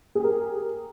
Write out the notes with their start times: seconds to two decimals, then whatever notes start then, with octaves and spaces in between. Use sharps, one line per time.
0.15 G#4
0.20 G4
0.24 A#4